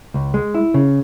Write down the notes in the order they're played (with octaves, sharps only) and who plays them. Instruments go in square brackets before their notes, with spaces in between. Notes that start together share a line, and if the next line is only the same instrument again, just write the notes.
[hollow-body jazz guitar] C#2
G#3
E4
C#3